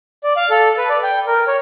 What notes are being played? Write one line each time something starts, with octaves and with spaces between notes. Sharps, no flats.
D5
F5
A4
B4
D5
G5
A#4
C#5